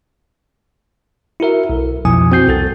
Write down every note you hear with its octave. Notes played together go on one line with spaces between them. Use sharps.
E4 F#4 A#4 E5
B1
F2 B2 F3 E4 G#5 D#6
C4 F#4 G6 C7
C2 A4 A6